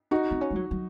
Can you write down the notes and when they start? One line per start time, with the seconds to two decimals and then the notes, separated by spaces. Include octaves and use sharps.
0.11 D#4 F#4
0.31 C4
0.41 C#4
0.51 G#3
0.56 F#3
0.71 F#3